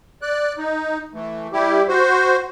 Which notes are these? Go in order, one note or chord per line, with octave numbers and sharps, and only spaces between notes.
D5 F#6
D#4
E3 A3
G3 E4 G4
F#4 C5